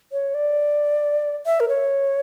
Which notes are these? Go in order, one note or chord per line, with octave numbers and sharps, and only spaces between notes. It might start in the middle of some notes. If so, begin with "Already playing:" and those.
C#5
D5
E5
A#4
C#5